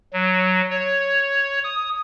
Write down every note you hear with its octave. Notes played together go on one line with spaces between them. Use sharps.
F#3
C#5
D#6